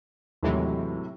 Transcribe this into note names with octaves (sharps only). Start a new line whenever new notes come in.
D#2 A2 C3 E3 F#3 G#3